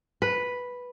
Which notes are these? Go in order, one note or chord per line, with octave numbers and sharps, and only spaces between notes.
B4